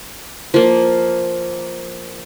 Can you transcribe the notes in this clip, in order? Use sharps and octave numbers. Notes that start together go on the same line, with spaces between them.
F3 A#3